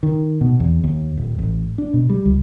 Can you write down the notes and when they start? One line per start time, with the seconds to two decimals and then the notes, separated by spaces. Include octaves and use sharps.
0.03 D#3
0.41 B2
0.60 E2
0.84 D#2
1.17 D#1
1.38 A1
1.78 D4
1.94 B2
2.10 G3
2.25 C#2